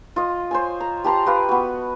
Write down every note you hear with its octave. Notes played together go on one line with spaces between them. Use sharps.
F4 D#5
C5 C#5 G#5
A#5
G4 A5 A#5 C6
G4 B4 F5
B3 F#4